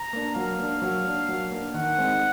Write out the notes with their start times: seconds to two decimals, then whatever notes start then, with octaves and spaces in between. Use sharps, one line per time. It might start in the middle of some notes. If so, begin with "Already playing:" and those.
Already playing: A#5
0.13 A#3 D4
0.35 F#3 F5
0.59 A#3 D4
0.82 F#3
1.05 A#3 D4
1.29 F#3
1.52 A#3 D4
1.74 D#3 F#5
1.98 G#3 C4 D#4